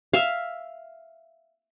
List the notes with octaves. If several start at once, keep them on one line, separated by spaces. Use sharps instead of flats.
E5 F5